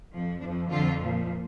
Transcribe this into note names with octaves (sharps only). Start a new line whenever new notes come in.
F2 F3
F2 F3 D4
F2 D3 F3 F4
A#2 F3